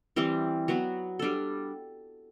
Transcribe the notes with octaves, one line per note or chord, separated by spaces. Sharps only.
E3 G3 C4
F#3 B3 F#4
G3 D4 A4